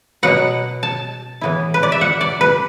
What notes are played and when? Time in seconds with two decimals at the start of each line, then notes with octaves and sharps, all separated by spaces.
0.23 B2 F#3 B3 F#5
0.83 A5
1.41 A2 E3 B3 E4
1.74 B4
1.83 D5
1.92 E5
2.01 F#5
2.21 D5
2.41 B4